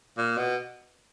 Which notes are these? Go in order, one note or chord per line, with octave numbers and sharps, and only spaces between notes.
A#2
B2